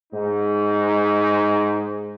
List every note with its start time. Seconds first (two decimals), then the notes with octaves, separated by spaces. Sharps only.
0.13 G#2 D#4